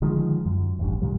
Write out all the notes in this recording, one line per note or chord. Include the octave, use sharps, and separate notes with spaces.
D3 D#3 F3 G#3
F#2
D#1 A1 G2
B1 A#2 D#3 G3